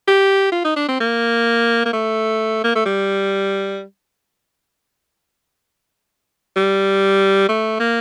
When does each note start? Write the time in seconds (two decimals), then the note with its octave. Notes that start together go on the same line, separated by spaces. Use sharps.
0.08 G4
0.52 F4
0.64 D#4
0.76 D4
0.88 C4
1.00 A#3
1.86 A#3
1.93 A3
2.64 A#3
2.75 A3
2.86 G3
6.56 G3
7.49 A3
7.80 A#3